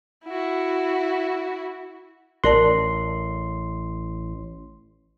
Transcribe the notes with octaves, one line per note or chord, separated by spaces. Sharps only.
E4 F#4
A1 A#4 D5 A5 C6